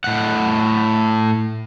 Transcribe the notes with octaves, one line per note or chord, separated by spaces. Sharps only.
A2 F#5